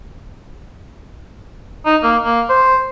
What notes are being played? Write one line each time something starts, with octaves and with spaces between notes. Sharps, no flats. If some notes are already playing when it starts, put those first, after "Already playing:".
D#4
A#3
A#3
C5